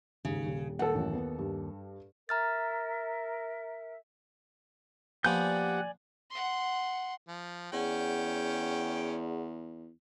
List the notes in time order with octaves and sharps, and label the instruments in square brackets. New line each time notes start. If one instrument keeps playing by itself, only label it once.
[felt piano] D#2 G#2 [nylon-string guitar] C#3
[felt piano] D#1
[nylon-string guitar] D#2 [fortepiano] A4 F#5
[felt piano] A1 F#2
B3
G2
[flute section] A#4 E5 [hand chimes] A#5 F6 A6
[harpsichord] F3 A#3 B3 [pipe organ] G4 F#5 [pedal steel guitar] D5 G#5 G6
[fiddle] F#5 C6
[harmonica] F3
[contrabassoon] E2 [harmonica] C#4 G5 [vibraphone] G#4 D5 F#5